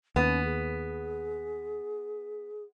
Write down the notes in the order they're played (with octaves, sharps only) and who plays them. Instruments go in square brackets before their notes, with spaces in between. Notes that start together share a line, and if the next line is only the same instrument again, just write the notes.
[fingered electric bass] D#2 [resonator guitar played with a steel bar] B3 [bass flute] C#4
[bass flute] G#4